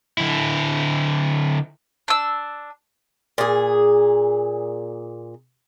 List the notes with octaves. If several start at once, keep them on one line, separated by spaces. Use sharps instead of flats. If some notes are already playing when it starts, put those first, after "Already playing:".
D3 E4
D4 E6
A#2 G#4